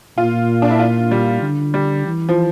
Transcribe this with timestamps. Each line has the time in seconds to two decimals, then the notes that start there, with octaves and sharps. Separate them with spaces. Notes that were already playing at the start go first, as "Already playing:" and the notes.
0.18 A#2 F4
0.62 D4
0.71 E4
0.79 F4
1.11 G3
1.42 D3
1.74 G3
2.06 E3
2.29 F3